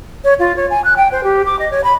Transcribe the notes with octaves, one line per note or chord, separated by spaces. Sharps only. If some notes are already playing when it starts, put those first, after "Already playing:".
C#5
F4
C#5
G#5
F#6
G5
C5
G4
D6
D#5
C#5
B5